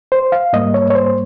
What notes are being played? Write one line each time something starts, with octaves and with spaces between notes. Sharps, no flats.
C5
F5
G#2 G3 A#3 D#5
C#5
C#5
C5